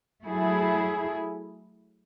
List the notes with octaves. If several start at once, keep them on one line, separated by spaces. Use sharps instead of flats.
F#3 A3 E4 G#4